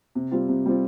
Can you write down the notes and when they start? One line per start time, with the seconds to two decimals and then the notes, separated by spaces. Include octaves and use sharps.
0.15 C3
0.31 G3 C4 F4
0.49 C3
0.66 G3 C4 F4